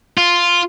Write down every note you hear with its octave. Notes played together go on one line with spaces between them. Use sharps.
F4